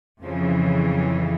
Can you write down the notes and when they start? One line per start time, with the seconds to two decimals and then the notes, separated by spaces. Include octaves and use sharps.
0.23 F2 C#3 E3 F3
0.90 F#3